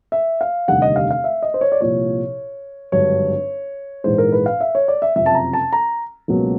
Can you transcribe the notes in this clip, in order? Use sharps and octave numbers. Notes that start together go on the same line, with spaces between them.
E5
F5
F1 D#2 D3 G3 F#5
D#5
F5
F5
E5
D#5
C5
C#5
D5
C2 A#2 F3 C#5
G#1 G2 D3 F#3 C#5
A#1 G#2 E3 G#3 C5
A#4
B4
F5
E5
C#5
D5
E5
F#1 F2 C3 E5
A5
A#5
A5
A#5
C#2 B2 F#3 A#3